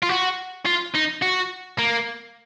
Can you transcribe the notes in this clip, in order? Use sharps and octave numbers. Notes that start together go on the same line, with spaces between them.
F4
F#4
F4
D#4
F#4
A#3